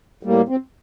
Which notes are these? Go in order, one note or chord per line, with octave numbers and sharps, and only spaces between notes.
A2 G3 A#3
C4